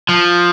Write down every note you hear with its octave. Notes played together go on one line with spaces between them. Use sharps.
F3